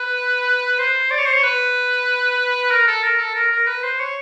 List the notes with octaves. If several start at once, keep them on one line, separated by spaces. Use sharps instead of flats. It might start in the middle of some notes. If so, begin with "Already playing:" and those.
Already playing: B4
C5
D5
C#5
C5
C#5
B4
A#4
A4
A#4
A4
A#4
A#4
B4
C5
C#5